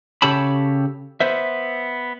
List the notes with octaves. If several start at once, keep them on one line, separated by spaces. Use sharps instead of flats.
C#3 G4 A4 C#5 A5 B5
B3 C5 E5